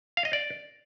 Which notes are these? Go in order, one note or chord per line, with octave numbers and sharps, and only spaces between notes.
F5
D#5
D5